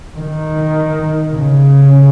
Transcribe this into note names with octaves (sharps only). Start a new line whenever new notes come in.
D#3
C#3